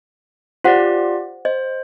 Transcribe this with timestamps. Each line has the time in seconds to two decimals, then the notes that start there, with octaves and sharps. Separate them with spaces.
0.64 F4 G4 C5 D5 F#5
1.45 C5 D#5